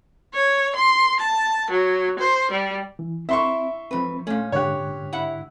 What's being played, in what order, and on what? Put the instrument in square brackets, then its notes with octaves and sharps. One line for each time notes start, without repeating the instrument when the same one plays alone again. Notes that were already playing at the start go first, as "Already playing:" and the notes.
[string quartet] C#5
C6
A5
F#3
C5
G3
[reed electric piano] E3
[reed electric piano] C4 [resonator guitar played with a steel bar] E4 [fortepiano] E5 C6 C#6
[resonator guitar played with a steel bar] G#2 B4 [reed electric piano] F3 C4
[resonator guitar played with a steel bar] A#2 C#4 [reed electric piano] A3
[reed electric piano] G#2 D3 F#6 [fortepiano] G4 C#5
[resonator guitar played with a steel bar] E4 F#5